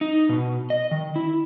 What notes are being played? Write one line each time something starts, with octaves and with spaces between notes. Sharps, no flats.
D#4
B2
D#5
D#3
E4